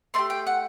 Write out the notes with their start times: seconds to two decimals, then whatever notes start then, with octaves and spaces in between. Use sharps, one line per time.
0.14 A3 D4 C6
0.18 G4
0.30 G5
0.47 F#5